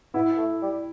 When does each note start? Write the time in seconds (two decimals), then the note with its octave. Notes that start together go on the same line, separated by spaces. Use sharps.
0.14 B3 E4
0.37 A3
0.63 G3